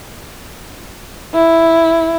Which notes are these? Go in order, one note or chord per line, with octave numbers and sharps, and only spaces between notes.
E4